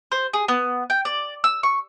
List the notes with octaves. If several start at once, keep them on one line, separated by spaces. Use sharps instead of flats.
C5
G#4
B3
G5
D5
E6
C#6